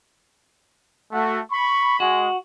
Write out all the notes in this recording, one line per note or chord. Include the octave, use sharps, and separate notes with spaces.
A3 F#4
B5 C#6
G#3 F#4